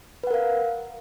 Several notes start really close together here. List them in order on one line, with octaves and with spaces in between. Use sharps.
B4 F#5 A#4 F5